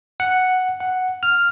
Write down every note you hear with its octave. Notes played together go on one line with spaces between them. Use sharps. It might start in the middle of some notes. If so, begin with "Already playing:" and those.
F#5
F#5
F6